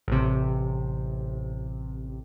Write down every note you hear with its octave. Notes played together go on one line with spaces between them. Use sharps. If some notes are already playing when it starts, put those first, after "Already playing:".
A1 C3